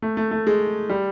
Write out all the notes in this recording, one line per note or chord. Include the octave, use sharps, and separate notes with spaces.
A3
A3
A3
G#3
G3